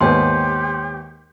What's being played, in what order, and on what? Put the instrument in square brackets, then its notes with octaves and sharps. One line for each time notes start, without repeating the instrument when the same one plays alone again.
[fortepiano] D#2 G#2 B3 [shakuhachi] G4 [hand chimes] C#5 G5 C6